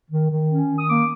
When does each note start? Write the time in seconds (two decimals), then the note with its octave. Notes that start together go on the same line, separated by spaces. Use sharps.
0.10 D#3
0.30 D#3
0.49 C#4
0.69 D#3
0.78 D#6
0.89 A#3 D6